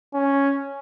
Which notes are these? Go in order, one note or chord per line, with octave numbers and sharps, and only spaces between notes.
C#4